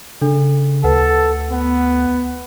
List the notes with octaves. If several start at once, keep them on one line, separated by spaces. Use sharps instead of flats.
C#3 D4 A4
D2 A4 B4 F#5
B3